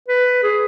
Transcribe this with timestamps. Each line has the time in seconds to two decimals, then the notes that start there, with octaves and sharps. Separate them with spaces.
0.09 B4
0.43 G#4